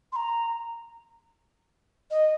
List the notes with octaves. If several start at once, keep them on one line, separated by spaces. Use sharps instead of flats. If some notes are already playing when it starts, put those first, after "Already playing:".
C6
A#5
D#5